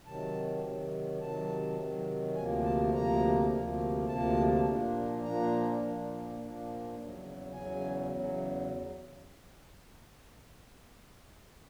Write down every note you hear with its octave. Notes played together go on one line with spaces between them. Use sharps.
C3 D#3 F#3 A5
C3 D#3 F#3
C3 D#3 F#3 A5
C3 D#3 F#3
D2 C3 F3 A#3 G#5
A5
D2 C3 F3 A#3 A#5
D2 C3 F3 A#3
D2 C3 F3 A#3 A5
A#2 F3 A#3 D4
A#2 F3 A#3 D4 A#5
A#2 F3 A#3 D4
A#2 F3 A#3 D4
E2 C#3 F#3
E2 C#3 F#3 G#5
E2 C#3 F#3